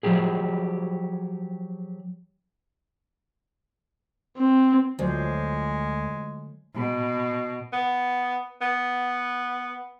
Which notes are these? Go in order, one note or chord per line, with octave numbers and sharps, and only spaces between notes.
F3 F#3 G4 G#4
C4
D2 F3 F#3 G#3 C5
B2
B3
B3